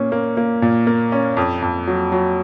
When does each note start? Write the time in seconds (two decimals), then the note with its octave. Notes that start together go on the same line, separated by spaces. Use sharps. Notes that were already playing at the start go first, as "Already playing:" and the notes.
Already playing: A#2 A#3 C#4
0.12 A#3
0.37 A#3
0.62 A#2
0.87 A#3
1.12 C#4
1.37 F2
1.62 F2
1.87 F#3
2.12 F#3